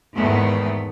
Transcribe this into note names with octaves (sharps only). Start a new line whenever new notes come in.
E2 G#2 D#3 A3 B3